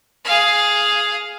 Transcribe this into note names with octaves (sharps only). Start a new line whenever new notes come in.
G#4 F5